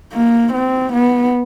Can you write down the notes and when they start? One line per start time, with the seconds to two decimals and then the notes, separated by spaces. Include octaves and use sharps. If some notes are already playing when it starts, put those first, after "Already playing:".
0.13 A#3
0.53 C4
0.93 B3